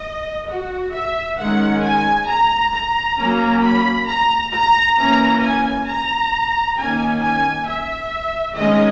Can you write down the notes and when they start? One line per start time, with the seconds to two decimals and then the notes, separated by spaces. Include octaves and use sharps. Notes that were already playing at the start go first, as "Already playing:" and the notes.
Already playing: D#5
0.49 F#4
0.93 E5
1.38 D#3 G#3 C#4 F#5
1.83 G#5
2.28 A#5
2.73 A#5
3.18 F#3 A#3 C#4
3.62 B5
4.07 A#5
4.53 A#5
4.97 E3 A#3 C#4 A#5
5.42 G#5
5.88 A#5
6.77 D#3 A#3 C#4 G#5
7.22 G#5
7.66 E5
8.56 D#3 G#3 C#4 D#5